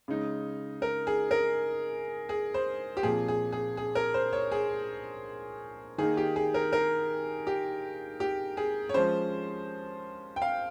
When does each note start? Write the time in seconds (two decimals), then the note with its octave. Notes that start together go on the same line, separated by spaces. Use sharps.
0.08 C#3 G#3 D#4
0.82 A#4
1.07 G#4
1.31 A#4
2.29 G#4
2.54 C5
2.97 G4
3.03 A#2 F3 C4 G#4
3.28 G#4
3.53 G#4
3.77 G#4
3.95 A#4
4.14 C5
4.33 C#5
4.52 G#4
5.98 D#3 A#3 D#4 G#4
6.17 G4
6.36 G#4
6.54 A#4
6.73 A#4
7.47 G4
8.20 G4
8.57 G#4
8.89 C#5
8.94 F3 G#3 C#4 C5
10.36 G5
10.42 F5